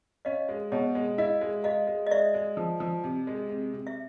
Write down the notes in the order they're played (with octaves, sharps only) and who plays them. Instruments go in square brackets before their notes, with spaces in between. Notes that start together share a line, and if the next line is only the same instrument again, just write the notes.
[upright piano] C#4 [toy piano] D#5 F5
[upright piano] G#3
[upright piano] B2 [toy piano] C#5 D#5
[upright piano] G#3
[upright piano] E4 [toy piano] D#5 F5
[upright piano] G#3
[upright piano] G#3 [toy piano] D#5 F5
[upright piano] G#3
[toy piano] D#5
[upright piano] G#3 [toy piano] D5 E5
[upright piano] G#3
F3
F3
C3
G#3
C3
C3
[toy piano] E5